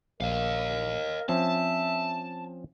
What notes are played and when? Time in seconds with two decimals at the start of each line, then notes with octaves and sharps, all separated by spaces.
0.20 A#1 A#4 D#5 F5
1.29 F3 C4 C#4 E5 A5